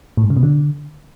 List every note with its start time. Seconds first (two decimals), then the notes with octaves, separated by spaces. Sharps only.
0.17 A2
0.24 G#2
0.30 C#3
0.37 B2
0.43 D3